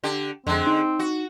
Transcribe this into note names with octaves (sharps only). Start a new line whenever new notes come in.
D3 G4
F2 D3 G#3 C4
D#4
F#4